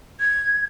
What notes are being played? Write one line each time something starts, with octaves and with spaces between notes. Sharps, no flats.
G#6